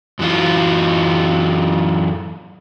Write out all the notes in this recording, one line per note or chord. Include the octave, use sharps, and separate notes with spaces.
F#2 E3 F#3 F4